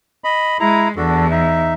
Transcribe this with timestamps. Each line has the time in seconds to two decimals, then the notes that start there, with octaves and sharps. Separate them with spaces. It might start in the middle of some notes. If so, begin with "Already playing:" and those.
0.24 D#5 B5
0.60 G#3 E4 A#5
0.97 E2 D4 F#4 A4
1.31 D#4 E5